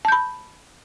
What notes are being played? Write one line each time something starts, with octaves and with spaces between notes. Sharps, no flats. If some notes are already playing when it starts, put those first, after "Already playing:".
A5 B5 G6